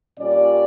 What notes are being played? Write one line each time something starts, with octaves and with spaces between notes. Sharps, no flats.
A#2 G3 C#4 D5